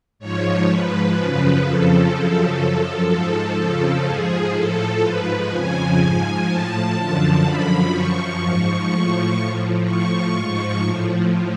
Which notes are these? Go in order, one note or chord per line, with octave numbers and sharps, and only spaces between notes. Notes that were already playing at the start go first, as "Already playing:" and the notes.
G#2 F3 C#5
G#2 F3 B4
F#2 C#3 F3
F2 C#3 F3 A4
F#2 C#3 F3
F#2 F3
G#2 F3 A4
F2 C#3 F3
G#2 F3 G#4
A2 F3 A4
G#2 F3 B4
F2 C#3 F3 G#5
G#2 F3
A2 F3 A5
F#2 D3 F3
F#2 D3 F3 B5
F#2 F3 C#6
G#2 F3
A2 F3
A2 F3
A2 F3 C#6
G#2 F3
A2 F3